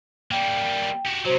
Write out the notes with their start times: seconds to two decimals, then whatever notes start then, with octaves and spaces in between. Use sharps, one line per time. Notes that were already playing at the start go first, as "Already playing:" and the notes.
0.31 G3 A#3 G5
1.05 F#4 G4
1.25 C3 F#3 F#4 C5